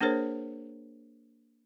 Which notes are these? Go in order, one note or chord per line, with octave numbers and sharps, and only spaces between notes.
A#3 D4 G#4 A#4 C5 C#5